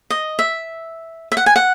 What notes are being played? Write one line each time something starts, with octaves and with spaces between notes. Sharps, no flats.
D#5
E5
E5
F#5
G#5
F#5